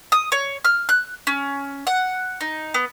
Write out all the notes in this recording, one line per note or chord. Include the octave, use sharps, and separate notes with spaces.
D#6
C#5
F6
F#6
C#4
F#5
D#4
B3